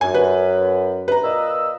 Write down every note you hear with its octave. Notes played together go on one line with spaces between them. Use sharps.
F#2 G#5
B4
B4 A#5
A#2 D#5 E6